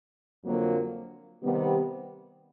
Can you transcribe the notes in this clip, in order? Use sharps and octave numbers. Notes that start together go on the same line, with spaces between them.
F2 D3 F#3 A#3
C3 D#3 G3 B3